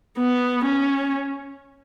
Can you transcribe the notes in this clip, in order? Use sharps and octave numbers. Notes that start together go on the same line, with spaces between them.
B3
C#4